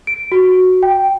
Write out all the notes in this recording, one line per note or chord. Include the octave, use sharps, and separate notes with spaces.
D7
F#4
G5